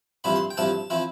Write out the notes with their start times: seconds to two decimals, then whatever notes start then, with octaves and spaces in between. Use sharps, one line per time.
0.24 G2 F3 C4 E4 B5
0.36 C6
0.50 G5
0.57 G2 F3 C4 E4 A5
0.90 F3 C4 E4